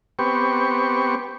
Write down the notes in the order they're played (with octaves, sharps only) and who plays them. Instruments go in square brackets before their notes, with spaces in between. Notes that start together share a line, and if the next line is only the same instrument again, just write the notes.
[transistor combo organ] B3 C4 G4 C#6